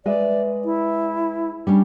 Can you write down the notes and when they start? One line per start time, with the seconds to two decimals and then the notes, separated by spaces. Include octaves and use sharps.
0.06 G#3 B4 D5 E5
0.65 E4
1.67 G3 C#4 D4